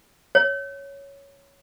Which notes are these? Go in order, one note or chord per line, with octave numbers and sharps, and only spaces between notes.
C#5